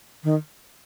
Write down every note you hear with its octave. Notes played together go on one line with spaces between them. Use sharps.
D#3